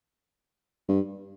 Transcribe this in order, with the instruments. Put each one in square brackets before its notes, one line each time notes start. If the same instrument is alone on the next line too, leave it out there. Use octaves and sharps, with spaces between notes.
[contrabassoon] G2